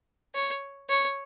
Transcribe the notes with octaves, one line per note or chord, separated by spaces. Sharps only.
C#5
C#5